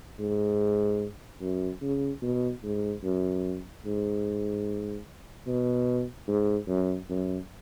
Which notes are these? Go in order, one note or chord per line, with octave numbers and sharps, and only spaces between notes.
G#2
F#2
C#3
B2
G#2
F#2
G#2
B2
G#2
F#2
F#2